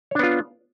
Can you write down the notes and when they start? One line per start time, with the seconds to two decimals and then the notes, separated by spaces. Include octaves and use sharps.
0.11 C#5
0.15 D4
0.19 B3
0.23 F4